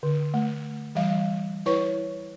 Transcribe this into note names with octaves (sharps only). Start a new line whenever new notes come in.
D3
A3
E3 G3 F5
E4 B4 C#5 C#6